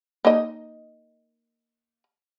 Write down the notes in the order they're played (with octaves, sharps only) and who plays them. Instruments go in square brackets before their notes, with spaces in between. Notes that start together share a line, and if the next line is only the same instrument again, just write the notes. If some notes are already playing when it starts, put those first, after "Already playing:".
[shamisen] A#3 D#4 D#5